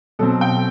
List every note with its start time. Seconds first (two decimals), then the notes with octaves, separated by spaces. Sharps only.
0.19 B2 F#3 C4 A4
0.41 G5